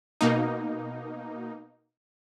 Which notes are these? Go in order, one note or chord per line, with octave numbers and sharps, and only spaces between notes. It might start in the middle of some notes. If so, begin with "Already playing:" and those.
B2 A#3 D#4